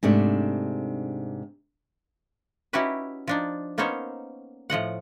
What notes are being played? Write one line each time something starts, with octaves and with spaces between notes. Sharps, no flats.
G#2 C3 A3 D4
C#4 D#4 E4 F#4 G4 B4
F3 D4 D#4
A#3 B3 C#4 D#4 C5 C#5
A2 F3 D#5 F#5